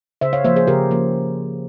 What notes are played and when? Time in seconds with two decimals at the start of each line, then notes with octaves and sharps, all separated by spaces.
0.21 C#3 C5 E5
0.33 C#5 F5
0.44 F3 A#3 C5 E5
0.56 G#4 C5
0.67 C#3 G4 A#4
0.91 F3 A#3